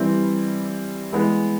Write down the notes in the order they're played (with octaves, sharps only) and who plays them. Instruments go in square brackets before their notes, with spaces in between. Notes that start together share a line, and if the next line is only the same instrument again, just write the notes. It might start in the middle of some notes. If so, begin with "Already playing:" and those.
Already playing: [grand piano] E3 G3 C4 E4
E3 G#3 B3